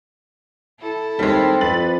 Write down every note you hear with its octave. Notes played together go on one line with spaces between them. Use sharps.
E4 A4
D#2 G3 G#3 C4
F2 B4 A6 F#7